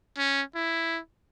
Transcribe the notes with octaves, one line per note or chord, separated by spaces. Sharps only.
C#4
E4